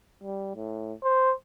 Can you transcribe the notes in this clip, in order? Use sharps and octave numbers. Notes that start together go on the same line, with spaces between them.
G3
A2
C5